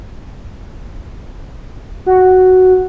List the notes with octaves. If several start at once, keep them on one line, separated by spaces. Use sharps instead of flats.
F#4